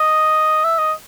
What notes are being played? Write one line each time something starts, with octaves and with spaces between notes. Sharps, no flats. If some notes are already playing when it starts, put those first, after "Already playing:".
Already playing: D#5
E5
D#5